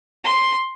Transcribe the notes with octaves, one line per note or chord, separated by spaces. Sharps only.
C6